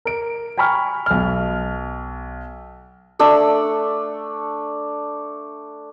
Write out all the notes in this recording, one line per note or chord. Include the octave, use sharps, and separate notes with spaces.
A#4 D7
G5 G#5 A#5 B5 C#6 F6
B1 F6
A3 D4 E6